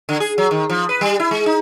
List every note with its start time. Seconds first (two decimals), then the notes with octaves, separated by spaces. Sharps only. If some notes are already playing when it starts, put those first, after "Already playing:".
0.09 D3
0.20 G#4
0.38 F#3
0.51 D#3
0.70 F3
0.89 B4
1.01 G3
1.20 E4
1.31 G#3
1.46 D#4